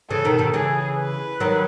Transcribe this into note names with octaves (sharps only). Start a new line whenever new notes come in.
C#3 E3 A4
B2 D#3
B2 D#3
C#3 E3 G#4
B4
D#3 F#3